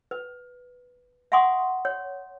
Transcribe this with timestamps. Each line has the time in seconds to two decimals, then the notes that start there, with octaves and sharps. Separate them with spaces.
0.11 B4
1.32 E5 F#5 G#5 C6 C#6 D#6
1.85 C#5